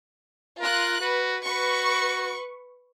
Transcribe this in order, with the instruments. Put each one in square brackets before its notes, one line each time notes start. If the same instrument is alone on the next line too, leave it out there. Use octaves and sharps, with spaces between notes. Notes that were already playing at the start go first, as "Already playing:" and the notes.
[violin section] F4 F#6 [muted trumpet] A#4
[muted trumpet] F#4 [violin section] B4
[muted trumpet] F#4 [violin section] B4 C#6